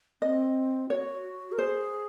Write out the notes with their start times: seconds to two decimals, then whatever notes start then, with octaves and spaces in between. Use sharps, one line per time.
0.22 C4 D#5
0.90 F#4 C#5
1.52 A#4
1.58 G#4 C5